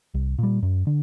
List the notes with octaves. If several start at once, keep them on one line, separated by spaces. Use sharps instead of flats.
C2
A#2 G3
F#2
D3